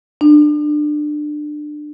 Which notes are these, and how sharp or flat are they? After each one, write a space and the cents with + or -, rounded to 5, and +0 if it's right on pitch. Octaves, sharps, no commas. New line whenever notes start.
D4 +25